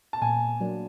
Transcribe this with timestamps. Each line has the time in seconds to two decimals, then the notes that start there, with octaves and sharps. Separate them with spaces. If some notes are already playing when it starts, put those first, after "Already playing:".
0.13 A5
0.22 A#2 G#5
0.61 F#3 A#3 D4